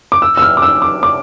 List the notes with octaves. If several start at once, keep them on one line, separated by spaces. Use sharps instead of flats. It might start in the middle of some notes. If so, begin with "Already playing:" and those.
D6
E6
E6
F6
D6
E6
D6
D6